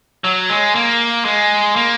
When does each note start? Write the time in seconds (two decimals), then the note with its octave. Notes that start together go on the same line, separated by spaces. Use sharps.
0.24 F#3
0.49 G#3
0.75 A#3
1.25 G#3
1.76 A#3